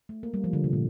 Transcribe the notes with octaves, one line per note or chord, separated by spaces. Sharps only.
A3
A#3
G3
F3
D3
C3
A#2